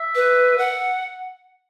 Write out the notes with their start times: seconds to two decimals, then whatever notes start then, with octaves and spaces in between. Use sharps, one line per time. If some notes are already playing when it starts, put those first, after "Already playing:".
Already playing: E5
0.15 B4
0.58 F#5